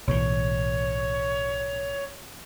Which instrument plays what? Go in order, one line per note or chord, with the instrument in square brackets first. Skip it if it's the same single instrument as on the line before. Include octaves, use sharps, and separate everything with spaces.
[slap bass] B1 A2 E3 [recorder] C#5